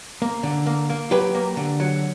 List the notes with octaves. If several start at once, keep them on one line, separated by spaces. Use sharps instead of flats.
A#3
D3
A#3
A#3
F#3 G4 B4
A#3
D3
F#3